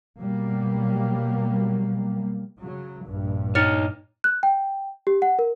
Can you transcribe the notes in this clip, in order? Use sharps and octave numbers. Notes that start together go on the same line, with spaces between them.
B2 F#3 G3 A#3
C#3 F#3
A#1 G2
D#4 C#5 F6 A6 C#7
F#6
G5
G4
F#5
A#4